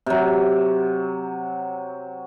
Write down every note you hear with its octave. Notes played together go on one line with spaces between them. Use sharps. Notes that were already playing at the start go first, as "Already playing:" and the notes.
C3 F#3